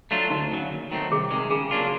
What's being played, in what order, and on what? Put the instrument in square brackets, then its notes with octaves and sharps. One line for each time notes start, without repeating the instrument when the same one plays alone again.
[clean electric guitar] F#3 A3 D4 F4
[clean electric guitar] D2 [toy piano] D#4
[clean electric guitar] C#3 F#3
D#2
D#3 F#3 A3 C4
[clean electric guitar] C2 [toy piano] G#4
[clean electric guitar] C3 D#3 G#3
[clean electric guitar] C#3 [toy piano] G#4
[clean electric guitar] F#3 A#3 D4 F4